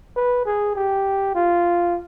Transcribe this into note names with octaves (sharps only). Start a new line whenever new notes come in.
B4
G#4
G4
F4